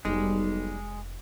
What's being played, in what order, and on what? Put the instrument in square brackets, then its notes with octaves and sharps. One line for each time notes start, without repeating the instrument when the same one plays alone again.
[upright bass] F1 [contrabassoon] B1 [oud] G3 D#4 G#4 [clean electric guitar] G#3